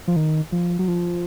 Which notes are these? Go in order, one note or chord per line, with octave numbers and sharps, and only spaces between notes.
F3
D#3
F3
F#3
F3